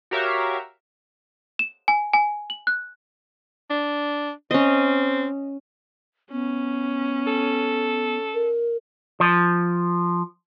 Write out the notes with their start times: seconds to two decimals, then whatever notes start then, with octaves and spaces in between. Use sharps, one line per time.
0.11 F#4 G4 A#4 C#5 E5 F5
1.59 E7
1.88 G#5
2.13 G#5
2.50 F#7
2.67 F#6
3.70 D4
4.51 C4 C#4 D#5
6.32 B3 C#4
7.27 A4
8.34 A#4
9.20 F3